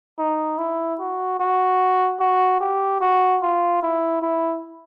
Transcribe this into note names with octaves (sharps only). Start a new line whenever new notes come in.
D#4
E4
F#4
F#4
F#4
G4
F#4
F4
E4
E4